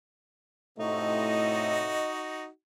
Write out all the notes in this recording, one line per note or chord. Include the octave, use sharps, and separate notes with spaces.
A2 C3 A3 D#4 F#4 D#5